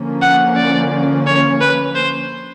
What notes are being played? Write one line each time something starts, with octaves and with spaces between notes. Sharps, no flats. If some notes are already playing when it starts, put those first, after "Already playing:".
Already playing: D3 F3 A#3 C#4
F#5
D5
C#5
B4
C5